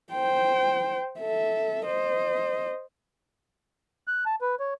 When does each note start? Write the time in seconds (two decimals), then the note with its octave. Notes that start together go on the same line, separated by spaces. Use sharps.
0.12 C5 G5
1.20 A4 E5
1.87 C5 D#5
4.07 F#6
4.26 A5
4.41 B4
4.60 C#5